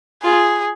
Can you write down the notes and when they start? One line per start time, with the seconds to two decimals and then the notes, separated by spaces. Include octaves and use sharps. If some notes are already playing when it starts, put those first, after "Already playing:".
0.23 F4 G#4